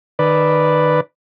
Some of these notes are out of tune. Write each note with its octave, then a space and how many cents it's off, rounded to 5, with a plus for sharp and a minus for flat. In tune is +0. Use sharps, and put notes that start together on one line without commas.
D#3 -25 B4 +0 D5 +0